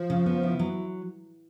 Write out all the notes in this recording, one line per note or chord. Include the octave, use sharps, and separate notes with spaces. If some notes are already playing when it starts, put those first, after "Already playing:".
Already playing: F3
C#3
B3
E4
F#3